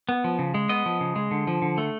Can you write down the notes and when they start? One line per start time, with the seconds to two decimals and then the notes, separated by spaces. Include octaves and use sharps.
0.09 B3
0.24 F3
0.39 C#3
0.54 G#3
0.69 B3 D#5
0.86 F3
1.01 C#3
1.16 G#3
1.31 D3
1.47 F3
1.62 D3
1.78 A3